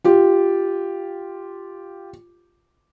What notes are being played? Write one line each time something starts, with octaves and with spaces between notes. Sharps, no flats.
F4 G4